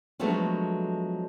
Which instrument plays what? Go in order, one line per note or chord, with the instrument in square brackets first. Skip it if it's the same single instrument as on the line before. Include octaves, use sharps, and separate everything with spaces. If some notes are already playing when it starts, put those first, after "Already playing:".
[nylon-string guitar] F3 F#3 G#3 A3 B3 D4